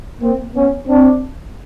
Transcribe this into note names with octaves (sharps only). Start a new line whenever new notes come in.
A#3 C4
B3 C#4
C4 D4